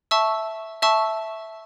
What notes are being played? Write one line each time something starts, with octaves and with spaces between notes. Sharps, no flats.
E5 A5 C#6 E6
E5 A5 C#6 E6